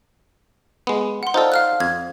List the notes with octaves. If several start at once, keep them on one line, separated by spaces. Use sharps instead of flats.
G#3 B3
F#5 C6
D#4 F4 A4 C5 D5
F5 F6 F#6
F2 G#6